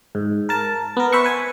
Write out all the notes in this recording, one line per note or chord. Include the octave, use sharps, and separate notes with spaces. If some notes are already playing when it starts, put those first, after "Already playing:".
G#2
A#4 A5
B3 A#4
B4 C5 E5 F#5 C#6
B4 G#5